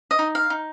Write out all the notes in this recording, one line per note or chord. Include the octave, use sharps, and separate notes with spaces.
D#5
D#4
F5
D#4